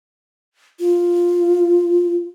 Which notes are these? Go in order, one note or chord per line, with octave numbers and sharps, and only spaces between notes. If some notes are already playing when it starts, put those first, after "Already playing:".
F4